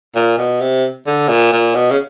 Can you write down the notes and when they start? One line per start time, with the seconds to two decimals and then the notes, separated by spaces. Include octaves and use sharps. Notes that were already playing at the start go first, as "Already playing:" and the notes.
0.16 A#2
0.38 B2
0.61 C3
1.07 D3
1.29 A#2
1.52 A#2
1.75 B2
1.91 C#3